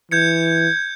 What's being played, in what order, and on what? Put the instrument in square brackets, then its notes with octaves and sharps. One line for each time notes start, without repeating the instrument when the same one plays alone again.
[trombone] E3 [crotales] G6 G#6 C#7